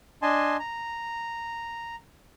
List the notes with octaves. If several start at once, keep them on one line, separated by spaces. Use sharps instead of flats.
D4 D#5 G#5 A5 C6
A#5